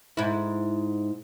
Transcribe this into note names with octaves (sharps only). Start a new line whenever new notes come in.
G#2 E4